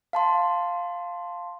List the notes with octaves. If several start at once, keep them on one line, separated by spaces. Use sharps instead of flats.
F5 A5 C6